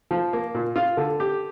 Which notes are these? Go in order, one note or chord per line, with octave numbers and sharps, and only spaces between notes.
F3
A#3
A#2
F4
D3
G4